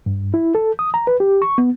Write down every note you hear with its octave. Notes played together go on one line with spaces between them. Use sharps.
G2
E4
A4
D#6
A#5
B4
G4
C#6
B3